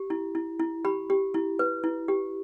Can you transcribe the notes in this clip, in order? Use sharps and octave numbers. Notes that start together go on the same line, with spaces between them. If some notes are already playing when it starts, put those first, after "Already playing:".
Already playing: G4
E4
E4
E4
G4 B5
G4
E4
B4
E4
G4